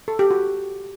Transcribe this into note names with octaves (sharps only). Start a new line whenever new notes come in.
A4
G4
F#4